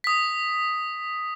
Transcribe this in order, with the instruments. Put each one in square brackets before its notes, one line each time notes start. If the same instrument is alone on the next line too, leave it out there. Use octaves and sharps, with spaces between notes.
[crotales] D#6 B6